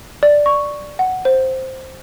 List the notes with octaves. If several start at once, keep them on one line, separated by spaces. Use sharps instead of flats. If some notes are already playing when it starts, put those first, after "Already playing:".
D5
C#6
F#5
C5